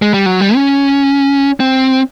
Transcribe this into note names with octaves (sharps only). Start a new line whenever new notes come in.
G#3
G3
F#3
G3
C#4
C4